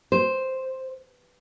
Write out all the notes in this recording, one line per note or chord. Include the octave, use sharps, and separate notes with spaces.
C5